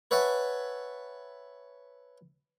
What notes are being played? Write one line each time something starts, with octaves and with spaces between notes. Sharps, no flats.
B4 C#5 E5 F#5 G#5 A5